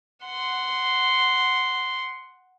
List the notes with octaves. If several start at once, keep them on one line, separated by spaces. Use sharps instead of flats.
F#5 C6